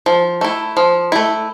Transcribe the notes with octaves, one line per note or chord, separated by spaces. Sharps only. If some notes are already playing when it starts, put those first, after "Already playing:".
F3
A3 E4
F3
A3 E4